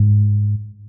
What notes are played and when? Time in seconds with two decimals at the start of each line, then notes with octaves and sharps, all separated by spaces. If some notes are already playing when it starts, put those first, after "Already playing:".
Already playing: G#2